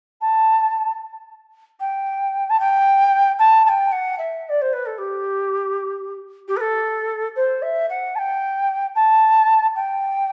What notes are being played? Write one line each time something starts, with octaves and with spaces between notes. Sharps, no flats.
A5
G5
A5
G5
A5
A5
G5
F#5
E5
D5
C5
B4
A4
G4
G4
B4
A4
C5
E5
F#5
A5
G5
A5
G5